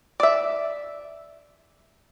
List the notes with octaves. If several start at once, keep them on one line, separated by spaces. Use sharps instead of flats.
D5 E5